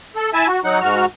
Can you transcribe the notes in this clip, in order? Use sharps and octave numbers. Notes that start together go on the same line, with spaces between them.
A4
E4 E5 G#5 A5
F#4
F#3 D#4 F#5
G#2 F#4 F6